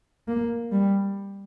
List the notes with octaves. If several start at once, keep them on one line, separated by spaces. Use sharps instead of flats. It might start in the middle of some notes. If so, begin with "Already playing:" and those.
A#3
G3